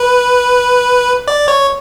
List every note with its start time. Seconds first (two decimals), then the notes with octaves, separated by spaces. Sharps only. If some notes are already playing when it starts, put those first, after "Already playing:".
Already playing: B4
1.28 D5
1.48 C#5